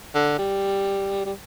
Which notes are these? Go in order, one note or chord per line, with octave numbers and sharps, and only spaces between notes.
D3
G3
G3